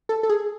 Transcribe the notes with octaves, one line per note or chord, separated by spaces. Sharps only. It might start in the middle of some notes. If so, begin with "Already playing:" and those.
A4
A4
G#4